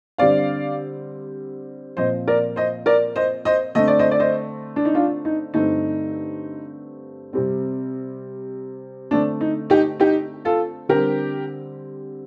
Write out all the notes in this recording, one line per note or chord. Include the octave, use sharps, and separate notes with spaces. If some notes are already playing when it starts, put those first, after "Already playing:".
D3 G3 C4 D5 F5
A#2 F3 C4 C5 D#5
A#4 D5
C5 D#5
A#4 D5
C5 D#5
C5 D#5
D3 A3 C4 D#5
D5
C5 D#5
D5
C5 D#5
D4
D#4
D4 F4
D#4
G2 D3 A3 C4 D#4
C3 G3 C4
D3 A3 C4 D4
D#4
D#4 G4
D#4 G4
F4 A4
D3 G3 C4 G4 A#4